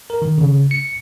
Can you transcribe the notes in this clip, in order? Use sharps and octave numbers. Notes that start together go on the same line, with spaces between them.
A#4
D#3
C#3
C#7